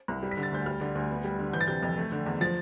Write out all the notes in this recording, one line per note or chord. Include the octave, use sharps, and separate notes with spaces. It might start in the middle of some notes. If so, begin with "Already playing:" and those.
C2
G3
B6
D3
A6
D2 G6
G3 F6
D3
D2
B3
G3
D3
E3 G6
A6
C3 G6
F2
A3
D3
E2
F3 A6